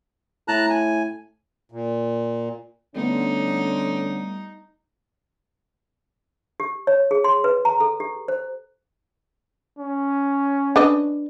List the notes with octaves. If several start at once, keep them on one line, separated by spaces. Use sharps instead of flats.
A2 A5 A#5 F#6
G#5
A#2
D3 G3 A3 B3 C#4 D#4
G4
C#5
G#4
C6
B4
A#5
A4
G4
C5
C#4
D4 B4 D#5